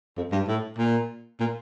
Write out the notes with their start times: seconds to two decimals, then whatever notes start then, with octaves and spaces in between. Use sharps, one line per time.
0.17 F2
0.32 G2
0.48 A2
0.78 A#2
1.40 A#2